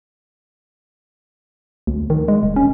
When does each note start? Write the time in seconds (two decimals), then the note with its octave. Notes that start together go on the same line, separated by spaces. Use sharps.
1.87 D2
2.10 D#3
2.28 G#3
2.43 E1
2.56 C#4